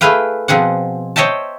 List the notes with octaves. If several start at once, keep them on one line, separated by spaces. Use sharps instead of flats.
A3 E4 G#4 B4 F5 G5
B2 F3 C4 G#4 F#5
C5 C#5 D#5 E5 G5 A5